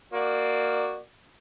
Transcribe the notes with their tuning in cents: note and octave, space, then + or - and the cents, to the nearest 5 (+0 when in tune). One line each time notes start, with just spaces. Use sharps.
A#3 +0 F#4 +0 D5 +25